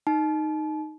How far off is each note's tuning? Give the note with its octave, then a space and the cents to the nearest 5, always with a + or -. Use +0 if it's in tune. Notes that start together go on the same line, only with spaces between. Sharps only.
D#4 -5 A5 -35